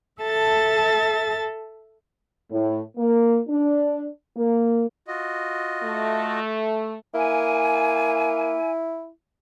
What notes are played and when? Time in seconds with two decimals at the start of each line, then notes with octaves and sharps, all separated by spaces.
0.22 A4 E5 A5 A6
2.52 A2
2.97 A#3
3.49 D4
4.36 A#3
5.08 F4 F#4 D#5
5.83 A3
7.14 A#3 E4 G#5